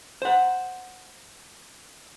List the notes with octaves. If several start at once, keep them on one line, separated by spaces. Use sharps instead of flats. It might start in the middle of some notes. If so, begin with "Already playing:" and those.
C5 F#5